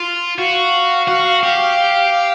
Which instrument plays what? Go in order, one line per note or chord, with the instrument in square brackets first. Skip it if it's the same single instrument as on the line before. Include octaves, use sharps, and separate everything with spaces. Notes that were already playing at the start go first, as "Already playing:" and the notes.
Already playing: [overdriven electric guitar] F4
[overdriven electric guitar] F#4 [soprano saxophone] F5
[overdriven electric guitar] F#4
G4